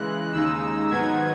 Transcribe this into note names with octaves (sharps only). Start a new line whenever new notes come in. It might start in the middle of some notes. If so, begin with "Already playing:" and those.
Already playing: C#3 E3 G#3 F#6
D#2 C#3 G#3 D#4 E6
G#2 D#3 F#3 B3 D#4 G#6